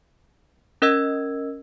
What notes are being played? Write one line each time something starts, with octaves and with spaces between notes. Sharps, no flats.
C#4 A#4 D#5 E6 G#6